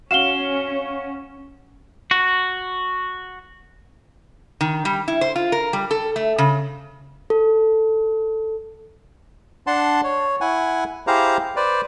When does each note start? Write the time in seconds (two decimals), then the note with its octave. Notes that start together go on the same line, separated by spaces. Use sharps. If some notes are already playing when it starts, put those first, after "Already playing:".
0.11 C#4 F#4 F5 E7 G7
2.11 F#4
4.61 D#3
4.85 G3
5.08 E4
5.21 C5
5.36 F4
5.52 A#4
5.73 G3
5.91 A4
6.16 A3
6.38 C#3
7.30 A4
9.67 D4 F#5 A5 C6
10.04 C#5
10.41 E4 F#5 G#5
11.07 E4 G4 G#4 C5 F5 A#5
11.56 B4 C5 D5